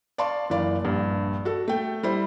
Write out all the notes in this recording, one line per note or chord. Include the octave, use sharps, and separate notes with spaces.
D5 F5 A5 C6 C#6
F#1 E3 D5 F5
A#1 G2
F#4 A4
A3 G5
G3 E4 C5